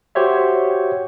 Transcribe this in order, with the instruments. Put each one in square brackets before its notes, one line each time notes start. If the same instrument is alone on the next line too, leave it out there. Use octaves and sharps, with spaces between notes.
[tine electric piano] F#4 G4 C5 C#5 E5